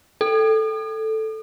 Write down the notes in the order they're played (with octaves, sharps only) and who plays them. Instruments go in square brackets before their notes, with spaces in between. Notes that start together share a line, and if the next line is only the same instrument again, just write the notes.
[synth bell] A4